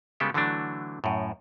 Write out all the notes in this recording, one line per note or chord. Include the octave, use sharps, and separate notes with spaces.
C#3 G3 G#3 B3 G4 A4
D3 E3 F#3 A3 D4
F#2 A2